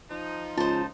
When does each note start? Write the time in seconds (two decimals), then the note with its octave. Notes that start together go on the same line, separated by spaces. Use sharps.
0.11 F3 D#4
0.57 C#2 F4 C5 A5